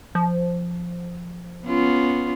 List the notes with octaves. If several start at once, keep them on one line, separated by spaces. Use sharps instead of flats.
F3
B3 C#4 F4